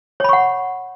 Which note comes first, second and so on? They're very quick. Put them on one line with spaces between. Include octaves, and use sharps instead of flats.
C#5 B5 C#6 F#5